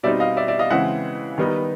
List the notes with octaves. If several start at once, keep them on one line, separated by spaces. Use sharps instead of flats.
B2 G3 C4 D#4 D5 E5
D#5 F5
D5 E5
D5 E5
D#5 F5
C#3 E3 G#3 C4 E5 F#5
D#3 G3 B3 D#4